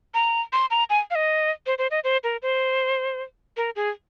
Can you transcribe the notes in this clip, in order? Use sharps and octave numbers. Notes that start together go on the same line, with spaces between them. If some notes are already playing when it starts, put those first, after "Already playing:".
A#5
C6
A#5
G#5
F5
D#5
C5
C5
D#5
C5
A#4
C5
A#4
G#4